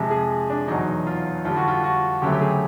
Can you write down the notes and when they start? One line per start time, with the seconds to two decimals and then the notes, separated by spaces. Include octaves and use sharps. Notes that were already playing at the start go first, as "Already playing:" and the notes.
Already playing: F2 C3 F3 G#3
0.10 G#4
0.50 D4
0.68 E2 B2 F#3 D#4
1.07 F4
1.45 F2 D3 G3 F4
1.56 F#4
1.68 F4
1.84 F#4
2.22 D2 C#3 F#3 A3 G4
2.32 G4
2.41 G#4